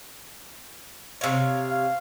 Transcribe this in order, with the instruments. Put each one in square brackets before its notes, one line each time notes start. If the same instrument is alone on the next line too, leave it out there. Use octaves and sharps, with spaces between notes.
[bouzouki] C3 C#5 [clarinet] F5
[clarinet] F5